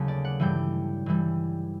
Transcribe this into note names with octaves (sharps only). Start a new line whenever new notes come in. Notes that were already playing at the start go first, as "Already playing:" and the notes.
Already playing: D#2 C#3 F#3 A3
D5
F#5
G2 E3 G3 G5
G2 E3 G3